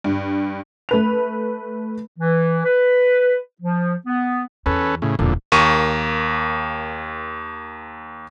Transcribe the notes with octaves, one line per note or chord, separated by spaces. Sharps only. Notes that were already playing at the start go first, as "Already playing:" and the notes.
G2
A3 B4 F7
E3
B4
F3
B3
E2 C#4 A4 B4
A2 C#3
E1 F2 A#2 D3
D#2 A#3 C#6 D#7